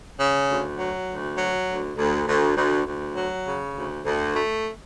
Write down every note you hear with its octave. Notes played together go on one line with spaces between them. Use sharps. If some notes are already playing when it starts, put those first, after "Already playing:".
C#3
D2
F#3
D2
F#3
D2
D2
D2
D2
D2
F#3
C#3
D2
D2
A3